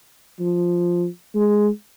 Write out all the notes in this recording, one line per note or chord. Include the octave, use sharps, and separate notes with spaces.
F3
G#3